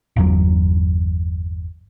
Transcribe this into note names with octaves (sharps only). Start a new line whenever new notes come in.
G1 E2 F#3